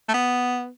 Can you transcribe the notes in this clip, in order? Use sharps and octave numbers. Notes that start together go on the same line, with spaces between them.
A3
B3